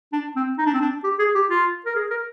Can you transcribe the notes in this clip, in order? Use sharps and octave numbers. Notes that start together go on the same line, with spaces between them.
D4
C4
D#4
D4
C4
D4
G4
G#4
G4
F4
A#4
G#4
A#4